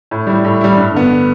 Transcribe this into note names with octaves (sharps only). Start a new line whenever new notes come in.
A2
G3 E4
A2
G3 E4
G2
D3 B3